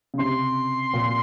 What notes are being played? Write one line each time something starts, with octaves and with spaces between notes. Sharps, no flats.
C#3
C3 C6
A#2